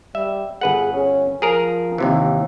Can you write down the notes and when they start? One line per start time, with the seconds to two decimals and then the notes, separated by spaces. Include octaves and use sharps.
0.15 G3 E5
0.61 G1 G#4 B4 F#5
0.94 C#4
1.42 F3 G#4 A#4 A#5
1.98 D#2 C3 E3